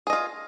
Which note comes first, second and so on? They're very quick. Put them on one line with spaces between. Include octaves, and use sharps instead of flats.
G#4 D#5 F4